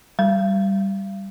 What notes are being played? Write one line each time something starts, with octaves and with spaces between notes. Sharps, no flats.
G3